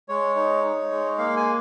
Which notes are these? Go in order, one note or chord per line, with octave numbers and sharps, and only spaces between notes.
G#3 C#5
D#4
D#4
G#3
A#3 F5
G#5